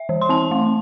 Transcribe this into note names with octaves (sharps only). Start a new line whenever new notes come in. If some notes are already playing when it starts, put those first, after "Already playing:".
Already playing: E5
E3
C6
C4 A5
A3